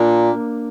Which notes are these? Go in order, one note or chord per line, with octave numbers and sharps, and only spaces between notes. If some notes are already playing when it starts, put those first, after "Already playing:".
Already playing: A#2 A#3 D4